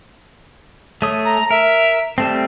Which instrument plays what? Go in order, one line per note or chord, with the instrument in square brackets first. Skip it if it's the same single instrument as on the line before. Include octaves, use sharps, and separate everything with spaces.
[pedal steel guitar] A3 C#5 D#6
[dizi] A#5
[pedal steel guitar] A#4 [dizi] E5
[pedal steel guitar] G3 A3 C4 [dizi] A5